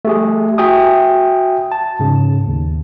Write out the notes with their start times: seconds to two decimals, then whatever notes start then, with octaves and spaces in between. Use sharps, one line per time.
0.05 A3 G4 G#4
0.58 F#4 E5 G5 G#5 D#6
1.72 A5
1.99 G#2 C#3
2.47 D#2